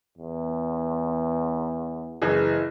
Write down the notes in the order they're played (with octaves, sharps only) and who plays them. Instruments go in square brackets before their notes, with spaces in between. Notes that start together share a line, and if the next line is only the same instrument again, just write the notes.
[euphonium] E2
[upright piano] F#1 E3 G#4